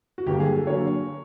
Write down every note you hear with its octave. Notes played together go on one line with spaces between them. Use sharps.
F#4
G1 G2 D3 F#3 A#3 G4
G#4
A4
D3 F#3 A#3 C#5